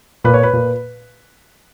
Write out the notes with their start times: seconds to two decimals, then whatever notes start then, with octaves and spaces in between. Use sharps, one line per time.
0.24 A#2 B4
0.34 C#5
0.43 B4
0.53 A#2